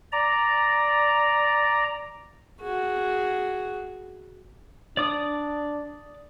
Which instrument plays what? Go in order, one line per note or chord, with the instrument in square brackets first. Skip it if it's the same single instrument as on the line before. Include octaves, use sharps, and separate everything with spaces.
[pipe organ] D5 A#5
[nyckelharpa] F#4 G#4
[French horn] D4 [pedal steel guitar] D5 D6 D#6